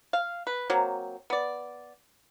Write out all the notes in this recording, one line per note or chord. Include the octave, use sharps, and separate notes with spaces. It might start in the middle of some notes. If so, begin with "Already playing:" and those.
F5
B4
F#3 A#3 C4
B3 D5